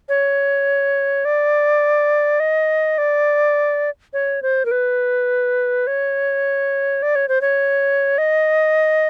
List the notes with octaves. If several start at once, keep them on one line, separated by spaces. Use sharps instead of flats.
C#5
D5
D#5
D5
C#5
C5
A#4
B4
C#5
D5
C#5
C5
C#5
D#5